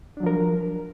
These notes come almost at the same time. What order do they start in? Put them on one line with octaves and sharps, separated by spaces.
D4 F#3 F3 A#4